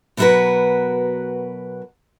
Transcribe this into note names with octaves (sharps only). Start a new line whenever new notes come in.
B2 F#3 E4 F#4 A#4 B4